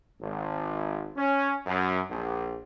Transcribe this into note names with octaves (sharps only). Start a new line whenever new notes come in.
G#1
C#4
F#2
A#1